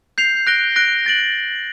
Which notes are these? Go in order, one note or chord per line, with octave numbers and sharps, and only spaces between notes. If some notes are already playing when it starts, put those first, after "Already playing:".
G6 C7 F7
F#6 A#6 D7 G7
F#6 A#6 D7 G7
F#6 A6 D7 F#7